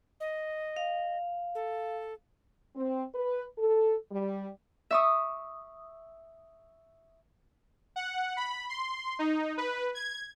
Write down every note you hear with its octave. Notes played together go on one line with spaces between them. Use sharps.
D#5
F5
A4
C4
B4
A4
G3
E5 C#6 D#6
F#5
B5
C6
D#4
B4
G#6